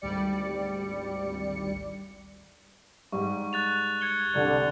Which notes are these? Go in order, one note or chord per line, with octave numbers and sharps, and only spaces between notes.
G#1 D2 G3 D5 C#7
G#2 G3 C#6
F#6 A6 F7
G#6 C#7 G7
C2 D3